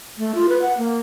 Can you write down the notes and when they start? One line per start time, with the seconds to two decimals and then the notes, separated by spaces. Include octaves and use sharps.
0.18 A3
0.35 F4
0.49 B4
0.62 F#5
0.78 A#3